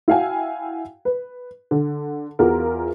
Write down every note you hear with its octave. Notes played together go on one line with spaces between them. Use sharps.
E4 F#4 F5 G5 G#5
B4
D3
E2 F4 F#4 A#4